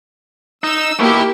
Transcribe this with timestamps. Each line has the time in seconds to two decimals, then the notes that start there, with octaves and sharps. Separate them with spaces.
0.64 D#4 E6
0.99 B2 A#3 E4 G4